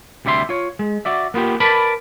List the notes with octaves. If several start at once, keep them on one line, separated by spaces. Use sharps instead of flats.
D2 C3 G3 E5 C6
F4 C#5
G#3
F#4 D5 E5
A#3 B3 F4 G4
A#4 B4 D5 A5 B5